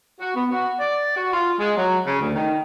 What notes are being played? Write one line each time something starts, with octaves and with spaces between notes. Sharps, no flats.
F#4
B3
F#4
D5
F#4
F4
G#3
F#3
C#3
D2
D#3